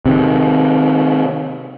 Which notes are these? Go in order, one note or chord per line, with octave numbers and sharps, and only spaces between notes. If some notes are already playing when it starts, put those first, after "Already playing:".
C3 D#3